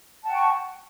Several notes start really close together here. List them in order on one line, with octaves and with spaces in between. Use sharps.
A5 F#5 G5 C#6